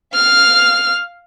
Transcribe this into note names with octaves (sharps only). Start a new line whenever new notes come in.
F5 F6